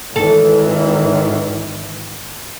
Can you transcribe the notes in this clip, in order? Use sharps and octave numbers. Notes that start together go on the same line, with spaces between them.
G#1 D#3 E3 A4